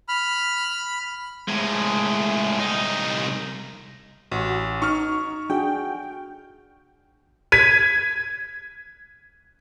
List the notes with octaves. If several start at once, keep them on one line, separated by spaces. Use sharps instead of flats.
B5 F6
A2 G#3
C2 D#4
A1 F#4
D#4 C#6 F6
D4 F#4 G#4 G5
G#6 B6 D#7